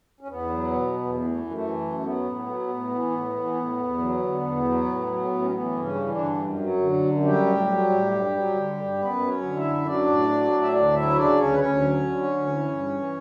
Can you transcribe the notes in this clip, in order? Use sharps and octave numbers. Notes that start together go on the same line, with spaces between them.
C#4
E2 B3
F#3
B2
E2
E3 B3
A3
F#2
A3
E3
F#2
F#3 B3
A2
F#3
A2
E3
A2
E3
A2
E2
F#3
D3
E2
F#3
A2
F#3
A2
C#4
E3 B3
G2
C#3 C#4
E3
D3 D4
G2
F#2
F#3
D3
F#2
F#3 G3 G4
A2
F#3
A2
G2
F#3
D3
G2
F#2 B3 B4
F#3
C#4 C#5
D3
E4 E5
F#2
F#3 D4 D5
A2
F#3
A2
E5
D2 D4 D5
F#3 E4 E5
C#3 D4 D5
D2 C#4 C#5
B4
D2 C#4 C#5
F#3
D3
D2
E3
G2
E3